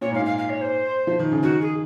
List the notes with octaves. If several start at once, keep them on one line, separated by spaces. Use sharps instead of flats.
A#2 C#5
G#2 F5
A#2
F5
F5
C#5
C5
F3
D#3
C#3
D#3 F#4
G#4